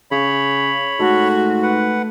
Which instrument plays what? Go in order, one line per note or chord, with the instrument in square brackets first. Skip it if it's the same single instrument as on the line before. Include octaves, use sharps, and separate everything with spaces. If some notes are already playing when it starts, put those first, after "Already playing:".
[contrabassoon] C#3 [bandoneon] C#5 B5
[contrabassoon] G#2 [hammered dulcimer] A3 [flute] F#4
[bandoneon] B4 F#5